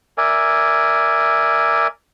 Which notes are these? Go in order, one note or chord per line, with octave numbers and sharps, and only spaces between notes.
A#4 D5 E5 G#5